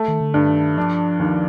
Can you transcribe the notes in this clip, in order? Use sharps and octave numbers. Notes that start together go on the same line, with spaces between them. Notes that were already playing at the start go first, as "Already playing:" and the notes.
Already playing: A3
D#3
D3
G2
D#3
F3 D4
D#2